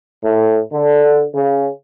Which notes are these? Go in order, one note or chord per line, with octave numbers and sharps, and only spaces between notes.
A2
D3
C#3